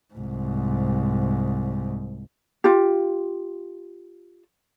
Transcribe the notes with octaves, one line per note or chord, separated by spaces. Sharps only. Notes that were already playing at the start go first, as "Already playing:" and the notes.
C2 G#2
F4 G4